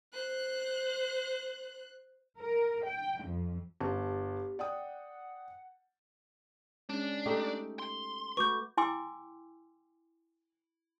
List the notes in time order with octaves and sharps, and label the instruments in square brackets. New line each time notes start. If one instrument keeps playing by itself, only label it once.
[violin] C5 F#6
[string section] A#4
G5
F2
[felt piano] G1 A5 [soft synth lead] G4
[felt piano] D5 G5 D#6 [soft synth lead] F#5
[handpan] G#3 C#4 [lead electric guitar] D4
[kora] A3 D#4 G4
[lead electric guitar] C6
[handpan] A3 F#4 B4 [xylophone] C#6 D6 G6
[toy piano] E4 G5 G#5 C6 D6 E6